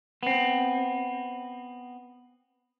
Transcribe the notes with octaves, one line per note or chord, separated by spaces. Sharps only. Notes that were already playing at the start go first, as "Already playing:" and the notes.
B3 C4